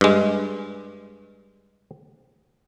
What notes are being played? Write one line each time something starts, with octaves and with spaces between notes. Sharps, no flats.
G2 G#3